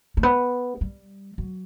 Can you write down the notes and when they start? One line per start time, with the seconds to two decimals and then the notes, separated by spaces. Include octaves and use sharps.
0.17 A3
0.23 B3
0.81 G3
1.38 F#3